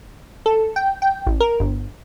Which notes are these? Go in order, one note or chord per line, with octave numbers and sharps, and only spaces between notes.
A4
G5
G5
A1
A#4
G1